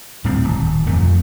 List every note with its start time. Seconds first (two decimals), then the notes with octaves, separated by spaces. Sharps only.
0.24 D1 A2 G3 C4
0.44 D#1
0.87 F2 F3 A3